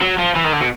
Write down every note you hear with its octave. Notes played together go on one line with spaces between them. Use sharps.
F#3
F3
E3
D#3
D3
B2